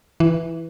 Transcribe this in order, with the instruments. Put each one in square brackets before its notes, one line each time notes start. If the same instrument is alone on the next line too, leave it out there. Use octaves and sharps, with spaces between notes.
[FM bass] E3